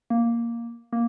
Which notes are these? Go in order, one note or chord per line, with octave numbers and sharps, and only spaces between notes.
A#3
A#3